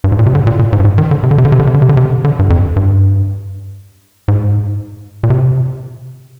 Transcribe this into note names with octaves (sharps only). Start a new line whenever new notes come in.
G2
G#2
A#2
C3
D3
A#2
A#2
G#2
G2
G#2
D#3
D3
C3
D3
C3
D3
C3
D3
C3
D3
C3
D3
C3
D3
G2
F2
G2
G#2
A#2
C3